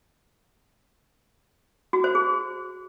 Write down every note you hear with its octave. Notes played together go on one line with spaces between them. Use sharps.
F#4
C5
G#4